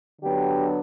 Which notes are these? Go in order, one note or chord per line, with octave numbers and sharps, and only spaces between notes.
D3 F#3 B3 D4 G4